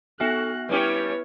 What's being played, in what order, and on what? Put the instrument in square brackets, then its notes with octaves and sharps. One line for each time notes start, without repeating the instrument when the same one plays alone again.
[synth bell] B3 E5 F6 [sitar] F#4 [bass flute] A4 [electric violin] F#6
[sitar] G3 C#4 G4 [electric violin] E4 C#5 [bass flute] B4